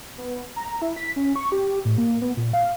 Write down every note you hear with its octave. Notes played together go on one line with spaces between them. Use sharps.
B3
A#5
E4
B6
C#4
C#6
G4
A2
A#3
B3
A#2
F5